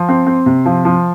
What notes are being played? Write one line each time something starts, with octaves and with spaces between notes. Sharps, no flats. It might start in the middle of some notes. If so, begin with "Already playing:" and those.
Already playing: F3
C4
C4
C3
F3
F3